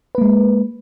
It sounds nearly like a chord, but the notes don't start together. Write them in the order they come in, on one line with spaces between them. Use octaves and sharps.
B4 A#3 G#3